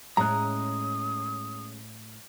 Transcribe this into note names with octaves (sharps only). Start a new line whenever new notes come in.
A2 G#3 C#4 A#5 D#6 F#6